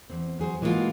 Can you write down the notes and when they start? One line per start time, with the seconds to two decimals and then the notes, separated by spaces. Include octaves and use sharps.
0.10 E2 C4
0.40 F#3 G#4 B4 C5
0.62 E3 G#3 A#3 B3 F4 F#4